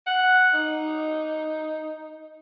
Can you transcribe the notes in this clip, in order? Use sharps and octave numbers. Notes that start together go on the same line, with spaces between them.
F#5
D#4